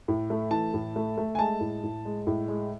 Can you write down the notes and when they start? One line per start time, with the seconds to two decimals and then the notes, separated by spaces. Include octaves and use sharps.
0.08 A2
0.30 A3
0.51 E3 A5
0.74 A2
0.96 A3
1.18 A3
1.35 G#5
1.39 G#3 A5
1.61 A2
1.83 A2
2.05 G#3
2.27 A2
2.48 G#3